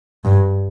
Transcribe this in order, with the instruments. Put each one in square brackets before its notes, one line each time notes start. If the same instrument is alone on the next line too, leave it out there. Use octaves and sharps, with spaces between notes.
[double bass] G2